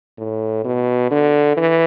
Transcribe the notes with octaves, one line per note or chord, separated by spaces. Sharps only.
A2
B2
D3
E3